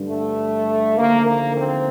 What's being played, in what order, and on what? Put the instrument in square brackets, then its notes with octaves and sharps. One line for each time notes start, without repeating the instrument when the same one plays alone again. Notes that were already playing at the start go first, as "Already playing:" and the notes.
Already playing: [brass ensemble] G2 D3
A3
D#2 D3 F3 A3 A#3
A#3
C4